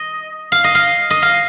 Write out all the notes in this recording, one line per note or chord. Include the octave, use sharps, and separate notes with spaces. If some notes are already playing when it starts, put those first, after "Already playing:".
Already playing: D#5
F5
D#5
F5
D#5
F5